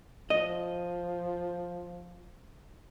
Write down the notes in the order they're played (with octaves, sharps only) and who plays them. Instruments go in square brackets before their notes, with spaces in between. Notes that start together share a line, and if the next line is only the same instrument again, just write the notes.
[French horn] F3 [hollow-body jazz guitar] D#5